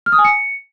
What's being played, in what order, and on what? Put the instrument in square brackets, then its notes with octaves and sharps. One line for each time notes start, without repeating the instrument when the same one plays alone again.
[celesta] F6
D#6
G#5
C#7